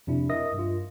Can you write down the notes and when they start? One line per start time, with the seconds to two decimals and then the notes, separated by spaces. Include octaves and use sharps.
0.07 F2 C3 D4 E4
0.29 A#4 D#5 E5 D#6 A#6
0.54 G2 F4